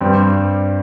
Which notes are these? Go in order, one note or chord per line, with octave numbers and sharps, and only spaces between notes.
G2 G3 C4